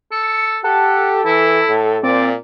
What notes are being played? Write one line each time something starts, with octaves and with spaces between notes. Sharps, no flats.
A4 C#7
G4 A4 F#5
E3 E4
A2
A#2 C4 D5